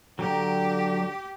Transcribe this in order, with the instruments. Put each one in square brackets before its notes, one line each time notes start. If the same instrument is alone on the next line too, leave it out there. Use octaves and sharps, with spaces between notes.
[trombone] D3 [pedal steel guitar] F#3 G5 A#5 [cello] G4